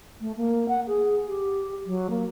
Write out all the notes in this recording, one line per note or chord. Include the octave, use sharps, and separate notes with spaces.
A3
A#3
F#5
G#4
G4
F#3
A#3